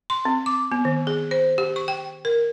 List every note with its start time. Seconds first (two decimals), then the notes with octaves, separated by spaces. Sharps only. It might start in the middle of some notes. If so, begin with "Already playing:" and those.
0.10 C6
0.25 C4
0.46 D6
0.72 B3
0.85 D#3
1.07 G#4
1.31 C5
1.58 G4
1.76 C#6
1.88 G5
2.25 A#4